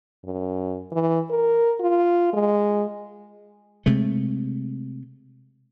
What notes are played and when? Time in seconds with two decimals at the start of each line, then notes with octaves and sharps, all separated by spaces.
0.24 F#2
0.92 E3
1.30 A#4
1.80 F4
2.33 G#3
3.86 C3 G#3 A3